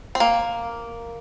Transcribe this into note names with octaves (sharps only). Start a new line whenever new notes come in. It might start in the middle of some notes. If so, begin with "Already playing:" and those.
C4
A#3